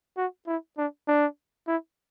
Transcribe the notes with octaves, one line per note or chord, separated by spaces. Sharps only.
F#4
E4
D4
D4
E4